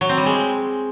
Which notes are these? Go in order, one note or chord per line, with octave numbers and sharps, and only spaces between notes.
F#3
C4
G3
G#3